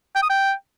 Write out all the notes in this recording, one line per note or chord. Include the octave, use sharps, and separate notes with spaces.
G5
D#6
G5